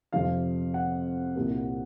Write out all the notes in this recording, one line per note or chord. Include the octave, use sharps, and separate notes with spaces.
F2 C3 F3 F5
F#5
C2 A#2 G3 A#3